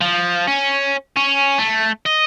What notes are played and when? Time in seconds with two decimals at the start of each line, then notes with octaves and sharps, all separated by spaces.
0.01 F3
0.47 C#4
1.17 C#4
1.59 A3
2.06 D#5